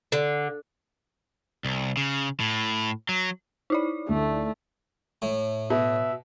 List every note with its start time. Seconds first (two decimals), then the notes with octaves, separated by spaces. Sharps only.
0.12 D3
1.65 C2
1.97 C#3
2.40 A2
3.09 F#3
3.70 D#4 E4 D5
4.09 D2 A3
5.22 A2
5.70 B2 E5